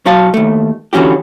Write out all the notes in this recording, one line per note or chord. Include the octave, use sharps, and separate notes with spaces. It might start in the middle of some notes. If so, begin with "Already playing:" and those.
B1 F#3 F#4 F5 A5
D#2 A3
D3 E3 C#4 F#4 G4